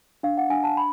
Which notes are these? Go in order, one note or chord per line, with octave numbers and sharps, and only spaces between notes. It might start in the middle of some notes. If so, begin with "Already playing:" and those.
D4 F5
F#5
D4 G#5
A5
B5